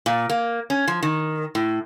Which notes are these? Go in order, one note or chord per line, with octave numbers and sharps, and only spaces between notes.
A#2
A#3
C#4
F3
D#3
A2